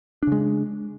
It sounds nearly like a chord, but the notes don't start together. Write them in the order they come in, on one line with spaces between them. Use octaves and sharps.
D4 C#3 G#3